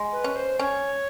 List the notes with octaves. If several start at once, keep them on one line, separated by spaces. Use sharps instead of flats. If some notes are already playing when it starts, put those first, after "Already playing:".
Already playing: G#3
B4
C#4
C5
C#4 C#5